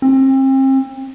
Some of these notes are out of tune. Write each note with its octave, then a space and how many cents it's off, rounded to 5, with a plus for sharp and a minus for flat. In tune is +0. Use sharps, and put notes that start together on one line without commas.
C4 +35